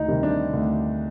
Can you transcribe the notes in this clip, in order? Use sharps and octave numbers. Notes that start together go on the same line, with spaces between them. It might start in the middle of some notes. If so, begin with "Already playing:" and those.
Already playing: D2 D#4
C3 D#3 G3
D4
D2